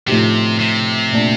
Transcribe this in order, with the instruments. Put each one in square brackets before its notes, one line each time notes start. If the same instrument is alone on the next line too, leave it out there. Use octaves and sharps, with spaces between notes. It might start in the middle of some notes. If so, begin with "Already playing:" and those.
[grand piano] A2 F3 A3 D#4 G4 [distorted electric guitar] C3
[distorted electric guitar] C3
[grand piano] A#2 A3 D4